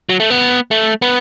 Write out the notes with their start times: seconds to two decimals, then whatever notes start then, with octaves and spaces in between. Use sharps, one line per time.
0.09 F#3
0.20 A3
0.30 B3
0.71 A3
1.02 B3